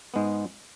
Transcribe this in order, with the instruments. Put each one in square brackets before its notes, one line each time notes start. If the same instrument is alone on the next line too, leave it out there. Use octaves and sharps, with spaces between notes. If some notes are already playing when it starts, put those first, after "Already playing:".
[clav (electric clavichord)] G#2 G#3 B3